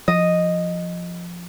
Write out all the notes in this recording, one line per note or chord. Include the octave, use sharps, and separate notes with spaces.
F3 D#5